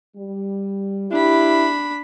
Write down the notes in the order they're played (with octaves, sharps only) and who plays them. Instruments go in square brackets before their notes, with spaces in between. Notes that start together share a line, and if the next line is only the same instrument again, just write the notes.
[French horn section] G3
[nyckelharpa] D4 B5 [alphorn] E4 [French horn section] G4